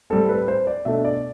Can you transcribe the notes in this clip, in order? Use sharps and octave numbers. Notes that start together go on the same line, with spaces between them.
A2 G3 C4 A4
B4
C5
D5
B2 A3 D4 E5
D5